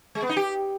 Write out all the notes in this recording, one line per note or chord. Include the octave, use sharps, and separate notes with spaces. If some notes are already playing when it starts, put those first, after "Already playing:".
G#3
B3
D#4
G4